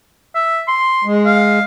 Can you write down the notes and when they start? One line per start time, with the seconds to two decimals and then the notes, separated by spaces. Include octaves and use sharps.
0.35 E5
0.68 C6
1.04 G#3
1.26 F5